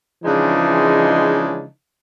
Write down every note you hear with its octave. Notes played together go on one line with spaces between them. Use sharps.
C#3 E3 F3 G#3 D4 D#4